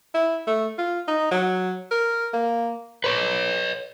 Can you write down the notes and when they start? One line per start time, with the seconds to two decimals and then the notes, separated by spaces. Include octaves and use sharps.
0.14 E4
0.47 A3
0.78 F4
1.07 D#4
1.31 F#3
1.91 A#4
2.33 A#3
3.04 B4 C#5